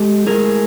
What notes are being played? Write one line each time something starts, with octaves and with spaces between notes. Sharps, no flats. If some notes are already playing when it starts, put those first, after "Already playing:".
Already playing: G#3 G4 A4
A2 F3 G#3 G#4 A#4